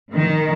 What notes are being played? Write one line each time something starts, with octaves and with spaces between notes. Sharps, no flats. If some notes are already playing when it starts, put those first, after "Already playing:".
D#3